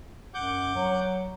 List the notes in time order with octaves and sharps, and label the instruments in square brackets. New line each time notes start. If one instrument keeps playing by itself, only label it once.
[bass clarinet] F#2 [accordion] F#5 D6 G6
[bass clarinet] F#3